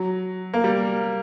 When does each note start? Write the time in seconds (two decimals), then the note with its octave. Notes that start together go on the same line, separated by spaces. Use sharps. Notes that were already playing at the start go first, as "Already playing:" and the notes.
Already playing: F#3
0.54 A#3
0.64 G3